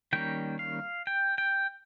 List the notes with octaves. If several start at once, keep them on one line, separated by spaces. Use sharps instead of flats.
D#3 G3 A#3 C#4 G5
F5
G5
G5